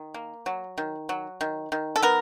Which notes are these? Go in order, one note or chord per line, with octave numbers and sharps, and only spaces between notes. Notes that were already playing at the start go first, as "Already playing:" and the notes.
Already playing: D#3
A#3
F#3
D#3
F#3
D#3
D#3
A4
B3 A#4